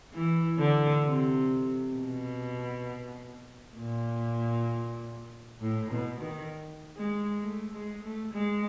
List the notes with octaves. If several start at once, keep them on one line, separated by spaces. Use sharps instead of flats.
E3
D3
C3
B2
A#2
A2
B2
D#3
G#3
A3
G#3
A3
G#3